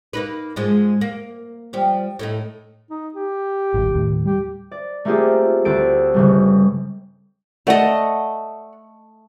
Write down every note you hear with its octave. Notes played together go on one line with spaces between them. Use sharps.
A#3 D#4 B4
G#2 F3 G#3
A#3
F3 G3
A2 A3 D#4
D#4
G4
D#1 G#1
D#2 A2
G3 G4
D5
A3 A#3 C4 F4 G4 G#4
D2 C4 A4 D7
G1 C#3 G3
A3 D5 D#5 F#5